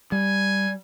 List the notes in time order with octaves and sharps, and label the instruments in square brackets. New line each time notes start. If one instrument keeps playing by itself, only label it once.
[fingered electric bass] G3 [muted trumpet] G#5